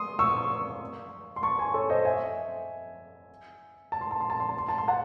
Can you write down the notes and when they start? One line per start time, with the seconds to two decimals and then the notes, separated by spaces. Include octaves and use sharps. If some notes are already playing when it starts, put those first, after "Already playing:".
Already playing: C6 D#6
0.19 C#6 E6
1.36 C6
1.43 A5 C#6
1.59 G#5 C6
1.74 A4 C#5
1.90 C5 D#5
2.05 E5 G#5
3.92 A5
4.01 C6
4.11 A5
4.20 C6
4.30 A5
4.40 C6
4.49 A5
4.58 C6
4.69 A5
4.78 C6
4.88 F#5 A5